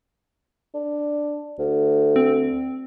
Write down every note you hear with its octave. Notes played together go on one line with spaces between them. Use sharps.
D4
D2
C4